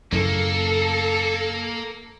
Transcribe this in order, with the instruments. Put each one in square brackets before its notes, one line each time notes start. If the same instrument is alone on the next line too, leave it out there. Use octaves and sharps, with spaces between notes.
[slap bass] F#2 A2 C#3 [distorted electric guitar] A#3 [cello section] A4